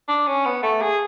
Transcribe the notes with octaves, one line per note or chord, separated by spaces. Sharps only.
D4
C#4
B3
A3
G#4